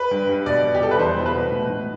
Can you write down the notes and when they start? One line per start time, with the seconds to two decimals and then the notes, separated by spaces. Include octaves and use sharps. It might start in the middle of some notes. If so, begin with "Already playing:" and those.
Already playing: B4
0.11 G2
0.29 G3
0.46 B2 D5
0.64 B2
0.75 G4
0.82 G3 A4
0.91 B4
0.99 E2 C5
1.17 B2
1.26 B4
1.35 B2
1.52 A2
1.70 A2